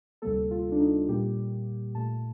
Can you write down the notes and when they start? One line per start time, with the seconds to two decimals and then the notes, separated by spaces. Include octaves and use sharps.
0.22 D2 C3 G3 A#3 A4
0.51 F4
0.72 D4
0.80 D#4
1.09 A#2 G3 A#3 G4
1.95 A#2 A3 A5